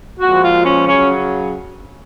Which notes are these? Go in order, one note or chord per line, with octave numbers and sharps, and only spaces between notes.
A#2 F3 G#3 F#4
F4
C#4
C#3 F#3 C#4